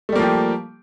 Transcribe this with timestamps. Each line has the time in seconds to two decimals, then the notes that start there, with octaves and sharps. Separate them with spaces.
0.09 A3
0.12 G3
0.16 A#3
0.19 F3
0.22 G4